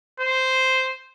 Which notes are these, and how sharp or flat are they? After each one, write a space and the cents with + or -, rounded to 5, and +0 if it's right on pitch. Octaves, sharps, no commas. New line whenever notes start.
C5 -5